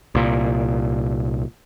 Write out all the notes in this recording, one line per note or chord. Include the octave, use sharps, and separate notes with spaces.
C2 A#2